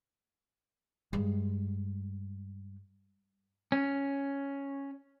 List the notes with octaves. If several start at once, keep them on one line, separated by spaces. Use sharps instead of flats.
G2 G#3
C#4